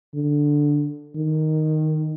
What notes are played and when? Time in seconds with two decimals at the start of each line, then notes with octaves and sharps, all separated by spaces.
0.15 D3
1.17 D#3